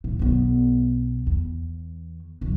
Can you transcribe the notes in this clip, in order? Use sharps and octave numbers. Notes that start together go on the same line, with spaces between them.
A2
B1 B3
E2
C#2 F#2